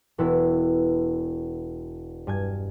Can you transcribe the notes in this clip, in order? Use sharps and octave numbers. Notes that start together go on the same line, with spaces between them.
E1 B3 E4
G2 G#5 G#6